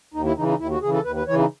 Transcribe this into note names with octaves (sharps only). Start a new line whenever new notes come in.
D#2 D#4
E4
C#3 E3 D#4
D#4
D#2 E4
F#4
C#3 E3 G#4
A4
D#2 B4
B4
C#3 E3 C#5
D#4